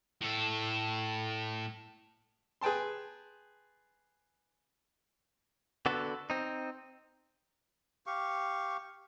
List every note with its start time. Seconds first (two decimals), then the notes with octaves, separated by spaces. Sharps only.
0.21 A2 A4
2.61 G#4 B4 G5 A5 C6
5.86 D3 B3 F#4 A4
6.30 C4 D#4
8.07 G4 F5 C#6